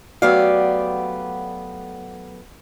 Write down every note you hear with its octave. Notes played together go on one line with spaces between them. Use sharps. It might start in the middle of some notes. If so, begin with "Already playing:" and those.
F#3 A3 B3 G4 D5 F5